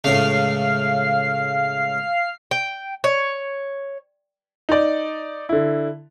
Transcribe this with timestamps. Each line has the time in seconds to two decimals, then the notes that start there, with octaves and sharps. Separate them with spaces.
0.04 C#2 A2 C#3 F5 F6 C7
2.51 G5
3.04 C#5
4.69 D#4 D5
5.49 D3 E4